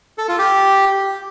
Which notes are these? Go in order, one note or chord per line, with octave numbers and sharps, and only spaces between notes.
A4
F4
G4